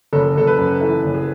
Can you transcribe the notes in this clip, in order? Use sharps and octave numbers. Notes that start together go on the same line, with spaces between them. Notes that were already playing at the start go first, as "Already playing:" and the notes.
F#1 A4
F#1 A4
B4
F#2
E3 A4
F#1
G#4